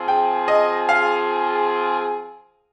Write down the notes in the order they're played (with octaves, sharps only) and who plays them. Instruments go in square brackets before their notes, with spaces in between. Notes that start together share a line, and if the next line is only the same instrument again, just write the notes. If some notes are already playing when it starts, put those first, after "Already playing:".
Already playing: [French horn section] F3 C4 F4 G#4
[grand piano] G5
D#5
F5